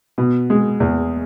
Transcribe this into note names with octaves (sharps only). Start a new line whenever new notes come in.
B2
G#3
E2